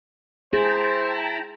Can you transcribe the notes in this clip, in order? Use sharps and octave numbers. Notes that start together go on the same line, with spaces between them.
E4 G#4 C5 G5 A5 A#5